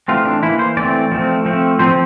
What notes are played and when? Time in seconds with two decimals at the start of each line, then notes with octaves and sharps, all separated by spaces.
0.08 E3 A3 C4 F4
0.25 D4
0.43 E3 A#3 E4
0.59 C5
0.77 E3 A3 C4 D5
1.12 F3 A3 C4
1.46 F3 A3 C4
1.79 F3 C4 C5